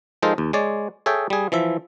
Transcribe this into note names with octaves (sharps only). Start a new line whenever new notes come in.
F3 G#3 D#4 A4 A#4 C5
D#2
G#3 C#5 D5
G#4 A4 C#5 E5 G5
G3 G#4
E3 F3 E5